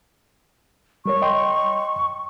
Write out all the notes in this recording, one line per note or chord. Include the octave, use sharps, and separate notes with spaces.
G3 A#4 C#5 C#6
D#5 G5 C6